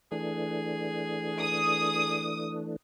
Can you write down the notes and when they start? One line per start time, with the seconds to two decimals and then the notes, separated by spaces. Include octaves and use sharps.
0.12 E3 A3 D4 G#4
1.40 D#6